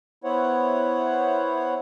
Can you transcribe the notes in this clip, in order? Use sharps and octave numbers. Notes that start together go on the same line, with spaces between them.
B3 E4 C5 C#5 F#5